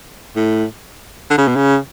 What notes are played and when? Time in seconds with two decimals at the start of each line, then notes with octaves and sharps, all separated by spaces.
0.36 A2
1.30 D3
1.38 C#3
1.48 B2
1.56 C#3